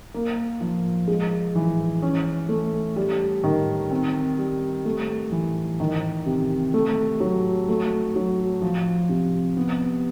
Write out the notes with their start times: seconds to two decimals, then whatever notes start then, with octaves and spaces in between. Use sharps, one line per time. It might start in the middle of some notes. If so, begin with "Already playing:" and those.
0.14 A#3
0.61 F3
1.08 G#3
1.55 E3
2.02 C#4
2.49 A3
2.96 G3
3.44 D#3
3.91 C4
4.39 G3
4.85 A3
5.32 E3
5.80 D#3
6.26 C3
6.74 A3
7.20 F#3
7.69 A3
8.16 F#3
8.62 F3
9.09 C3
9.57 B3